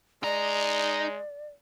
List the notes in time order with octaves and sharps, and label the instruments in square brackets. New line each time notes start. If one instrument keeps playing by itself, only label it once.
[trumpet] G#3 [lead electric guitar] D#4 A#5 [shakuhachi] D5